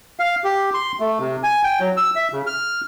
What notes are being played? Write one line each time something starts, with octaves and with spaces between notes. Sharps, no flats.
F5
G4
C6
A3
C3
G#5
G5
F#3
E6
E5
C#3
F6